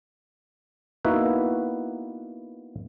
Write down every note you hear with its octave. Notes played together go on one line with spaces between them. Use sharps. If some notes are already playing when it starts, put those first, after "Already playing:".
A#3 B3 D#4 E4 F#4 B4